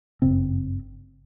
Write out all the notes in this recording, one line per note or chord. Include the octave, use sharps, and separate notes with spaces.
G1 F#2 C#3 C4